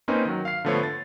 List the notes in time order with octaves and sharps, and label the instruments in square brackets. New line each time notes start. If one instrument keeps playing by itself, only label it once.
[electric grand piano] A#3 C4 C#4 D#4 B4
D#3 F#3
F5 C7
D3 F3 A3 B3 C#5
A6